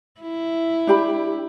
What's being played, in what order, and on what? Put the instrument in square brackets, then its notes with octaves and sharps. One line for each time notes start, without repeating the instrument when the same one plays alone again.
[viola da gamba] E4
[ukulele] D4 G4 B5